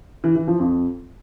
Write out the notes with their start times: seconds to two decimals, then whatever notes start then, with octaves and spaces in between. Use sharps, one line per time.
0.24 E3
0.36 E3
0.48 F3
0.60 F2